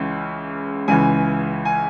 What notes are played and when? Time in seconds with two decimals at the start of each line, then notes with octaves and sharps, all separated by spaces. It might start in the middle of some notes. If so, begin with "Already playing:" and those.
Already playing: C#2 C#3 E3
0.88 C#2 C#3 E3 G#5
1.65 G#5